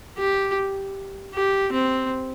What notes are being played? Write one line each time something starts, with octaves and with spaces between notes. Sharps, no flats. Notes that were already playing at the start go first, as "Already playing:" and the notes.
G4
G4
C4